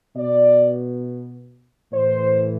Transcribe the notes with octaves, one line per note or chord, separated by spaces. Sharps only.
B2 D5
A2 E3 C5